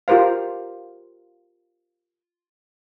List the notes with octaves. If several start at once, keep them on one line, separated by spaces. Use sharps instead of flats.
F4 G4 A#4 C5 F5